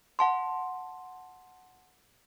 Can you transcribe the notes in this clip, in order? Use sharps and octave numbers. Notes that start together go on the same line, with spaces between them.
F#5 A5 C6